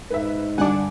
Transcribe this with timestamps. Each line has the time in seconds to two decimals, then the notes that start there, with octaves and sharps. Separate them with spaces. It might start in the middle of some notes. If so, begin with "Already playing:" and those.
0.10 G#2 B4 E5
0.58 G2 D3 D4 F#5 G#5 D6